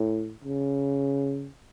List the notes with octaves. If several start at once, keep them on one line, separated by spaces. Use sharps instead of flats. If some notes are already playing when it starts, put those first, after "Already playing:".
Already playing: A2
C#3